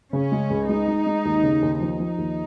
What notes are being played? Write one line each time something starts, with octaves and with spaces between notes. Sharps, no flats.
C#3 C#4
G#3
C#2
G#3 D#4
G#3
G#3
D#2
C#3
D#2
F3 D#4
F3
D#2